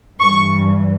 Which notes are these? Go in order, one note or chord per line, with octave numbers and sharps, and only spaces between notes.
G2 E3 C#6